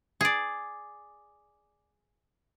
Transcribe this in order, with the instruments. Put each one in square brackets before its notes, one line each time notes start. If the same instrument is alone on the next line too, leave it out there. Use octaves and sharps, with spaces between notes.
[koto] G#4 D5